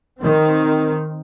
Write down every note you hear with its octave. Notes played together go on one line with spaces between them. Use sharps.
D#3 C4